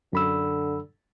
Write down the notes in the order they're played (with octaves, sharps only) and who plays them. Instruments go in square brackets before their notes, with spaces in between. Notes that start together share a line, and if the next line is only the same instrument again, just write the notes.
[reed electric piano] F#2 B5 E6 [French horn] D3